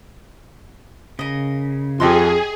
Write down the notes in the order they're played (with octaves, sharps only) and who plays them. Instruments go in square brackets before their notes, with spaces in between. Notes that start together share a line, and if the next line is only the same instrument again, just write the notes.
[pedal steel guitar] C#3 [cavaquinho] A#4 D#5
[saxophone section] F2 [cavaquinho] G4 D#5 C6 [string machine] G#4